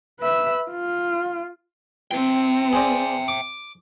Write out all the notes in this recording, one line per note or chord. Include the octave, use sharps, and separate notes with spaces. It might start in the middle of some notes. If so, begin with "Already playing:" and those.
B4 E5
F4
C4 E5 G5
G#4 C5 D5
D6